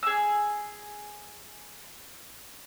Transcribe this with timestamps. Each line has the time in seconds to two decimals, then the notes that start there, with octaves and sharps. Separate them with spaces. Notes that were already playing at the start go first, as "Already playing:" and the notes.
0.03 G#4 E6